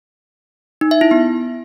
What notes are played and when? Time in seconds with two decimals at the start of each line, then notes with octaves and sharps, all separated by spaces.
0.81 D#4
0.91 E5
1.01 E4
1.11 B3